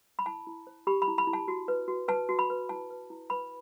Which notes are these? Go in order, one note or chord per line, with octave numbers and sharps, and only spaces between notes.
B5
E4 A5
E4
C5
G4 B5
B5
E4
B5
E4
A5
F#4
B4
F#4
B4 A5
F#4
B5
B4
E4 A5
B4
E4
B4 B5